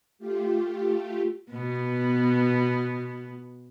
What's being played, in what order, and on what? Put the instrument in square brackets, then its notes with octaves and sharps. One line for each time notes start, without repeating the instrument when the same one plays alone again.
[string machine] A3 F4 G4
[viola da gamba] B2 B3